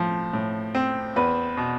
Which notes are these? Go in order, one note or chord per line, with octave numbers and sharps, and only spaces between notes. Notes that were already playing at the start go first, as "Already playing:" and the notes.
Already playing: A2 F3
A2
C4
E2 B4
B2